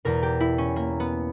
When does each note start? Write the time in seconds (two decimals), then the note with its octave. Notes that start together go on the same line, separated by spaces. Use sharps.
0.05 E2 B2 A#4
0.23 G4
0.40 E4
0.58 C#4
0.76 A#3
1.00 B3